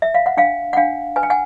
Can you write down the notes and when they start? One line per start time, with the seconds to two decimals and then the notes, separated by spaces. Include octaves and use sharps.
0.02 E5
0.14 F5
0.26 F#5
0.37 D4 F5 G5
0.73 F#5
0.77 D4 F5 G5
1.16 B4 G#5
1.23 G5
1.30 F#5 G#5